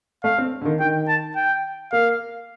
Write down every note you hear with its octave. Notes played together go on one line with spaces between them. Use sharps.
A3 F5
C4
D3
D#3
D#3 G5
A5
G5
A#3 F5